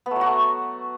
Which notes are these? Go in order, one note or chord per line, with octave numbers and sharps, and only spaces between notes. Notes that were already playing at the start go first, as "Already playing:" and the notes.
B3
A3
F#3
F#4
A3